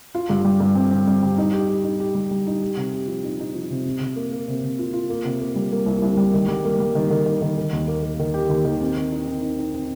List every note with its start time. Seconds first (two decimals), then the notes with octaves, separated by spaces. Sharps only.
0.15 F4
0.30 G2
0.45 G3
0.60 G2
0.75 C4
0.91 C4
1.07 G3
1.23 G3
1.38 D#4
1.53 G4
1.69 G4
1.84 D#4
2.00 G4
2.15 G3
2.31 G3
2.47 D#4
2.61 G4
2.76 C3
2.93 G4
3.08 F3
3.24 D#4
3.40 D#4
3.55 F3
3.70 C3
3.85 C3
4.00 C3
4.16 A#3
4.32 A#3
4.48 C3
4.63 C3
4.79 F4
4.93 F4
5.10 A#3
5.25 C3
5.41 A#3
5.56 G3
5.72 A#3
5.86 C2
6.02 C2
6.17 G3
6.34 D#3
6.48 G3
6.65 A#3
6.80 G3
6.95 D#3
7.10 D#3
7.26 D#3
7.42 D#3
7.57 D#3
7.73 D#2
7.87 A#3
8.03 A#3
8.19 D#3
8.34 G4
8.49 D#2
8.65 D#3
8.81 C4
8.97 C4
9.12 D#4
9.27 C4
9.42 D#4
9.59 D#4
9.74 C4